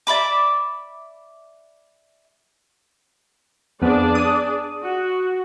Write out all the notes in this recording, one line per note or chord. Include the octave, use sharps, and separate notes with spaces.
D5 E5 B5 D6
F2 B3 D4 G#4 D5
D#6
F#4